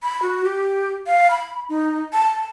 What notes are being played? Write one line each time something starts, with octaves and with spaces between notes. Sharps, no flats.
B5
F#4
G4
F5
B5
D#4
A5